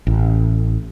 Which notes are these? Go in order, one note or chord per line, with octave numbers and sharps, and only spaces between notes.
A1